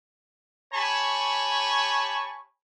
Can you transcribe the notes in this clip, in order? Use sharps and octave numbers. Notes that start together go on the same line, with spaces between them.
G4 C#5 G#5 A5 B5 C#6